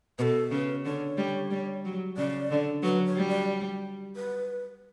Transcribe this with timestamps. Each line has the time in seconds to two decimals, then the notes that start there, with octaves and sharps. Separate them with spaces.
0.19 B2 A4 B4
0.51 C#3 B4
0.85 D3 C#5
1.18 G3
1.51 G3
1.85 F#3
2.17 C#3 D5
2.51 D3
2.83 F#3 B4
3.06 C#5
3.16 G3
3.28 D5
4.16 B4